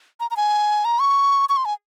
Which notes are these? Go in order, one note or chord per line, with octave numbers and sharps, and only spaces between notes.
A#5
A#5
G#5
A#5
C#6
C#6
C6
G#5